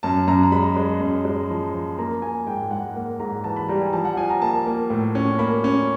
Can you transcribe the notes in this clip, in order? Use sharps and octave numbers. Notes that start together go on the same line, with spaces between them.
F#2 A5
F#2 A#5
A#5
G#3 B5
G#3
F#2
G#3
F3
F3
A#3 A#5
A#3 G#5
G#2 G5
G#2 F#5
A#3
G#2 A#5
E3 A5
B5
G3 A#5
G#5
F3 A5
F#5
F3 G#5
A#5
A#3 A5
A#3
A2
C#4
A#3 B5
C#4